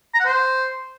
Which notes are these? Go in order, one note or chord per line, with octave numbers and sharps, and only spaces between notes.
A#5
F#5
C5